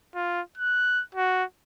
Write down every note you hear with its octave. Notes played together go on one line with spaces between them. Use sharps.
F4
F#6
F#4